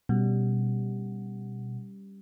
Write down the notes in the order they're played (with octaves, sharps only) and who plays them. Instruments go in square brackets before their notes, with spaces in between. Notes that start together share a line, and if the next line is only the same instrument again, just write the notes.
[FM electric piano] B2 [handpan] G3 C#4